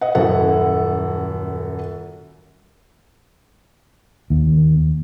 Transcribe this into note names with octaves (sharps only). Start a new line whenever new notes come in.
D#5 F#5
D#1 F#2 E4 A4 F#5
D#2